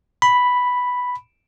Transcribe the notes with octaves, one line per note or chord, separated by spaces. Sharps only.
B5